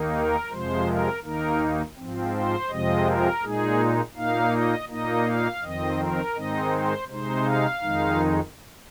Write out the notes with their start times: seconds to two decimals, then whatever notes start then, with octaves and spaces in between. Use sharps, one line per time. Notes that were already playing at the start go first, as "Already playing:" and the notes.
Already playing: D#2 D#3 A#3 D#4
0.14 A#4
0.50 F2 C3 F3 G#3 C5
0.87 A#4
1.23 D#2 D#3 A#3 D#4 A#4
1.97 G#2 F3 C4
2.33 C5
2.69 F2 C3 F3 G#3 C4 D#5
3.06 A#4
3.43 A#2 G#3 D#4 G#4
4.16 A#2 A#3 D#4 F5
4.52 D#5
4.89 A#2 A#3 D#4 D#5
5.26 F5
5.62 F2 D#3 C4 D#5
5.99 A#4
6.35 G#2 D#3 G#3 C4 D#4 D#5
6.72 C5
7.08 C3 G#3 D#4 C5
7.45 F5
7.81 F2 D#3 G#3 D#4